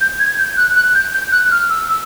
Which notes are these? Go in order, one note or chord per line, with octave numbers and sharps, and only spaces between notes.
G6
G#6
G6
F#6
F#6
G6
G6
F#6
F6
E6
E6